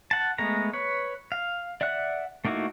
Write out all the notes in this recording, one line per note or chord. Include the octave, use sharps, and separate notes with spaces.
F#5 A5
G#3 A3 B3 A#5
B4 C#5
F5
D5 E5 F#5 F#6
A3 A#3 D#4 E4 F#4